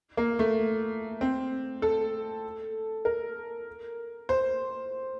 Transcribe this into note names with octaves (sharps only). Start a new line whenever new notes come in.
A#3
A3
C4
A4
A#4
C5